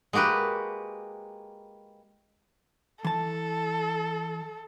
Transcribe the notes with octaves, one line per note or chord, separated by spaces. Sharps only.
G#3 A#3 F#4 G4 B4
E3 A4 A5